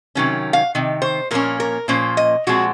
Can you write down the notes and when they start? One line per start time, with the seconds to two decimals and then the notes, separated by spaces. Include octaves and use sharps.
0.15 C3 D#3 F#3 C#4
0.53 F5
0.75 C3 D#3
1.02 C5
1.31 A#2 F3 A#3 C#4 A#4
1.60 A#4
1.88 A#2 F3 A#3 C#4 C5
2.17 D#5
2.47 A#2 F3 G#3 C4 F#4